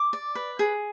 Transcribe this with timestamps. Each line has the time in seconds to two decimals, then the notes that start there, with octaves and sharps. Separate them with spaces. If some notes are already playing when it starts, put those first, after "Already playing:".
Already playing: D6
0.13 D5
0.35 B4
0.59 G#4